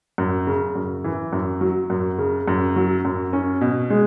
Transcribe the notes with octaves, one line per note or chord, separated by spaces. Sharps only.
F#2
C#3
F#2
E3
F#2
F#3
F#2
C#3
F#2
F#3
F#2
C#4
B2
G#3